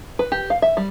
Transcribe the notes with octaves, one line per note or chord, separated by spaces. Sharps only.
B4
G4
F5
E5
G3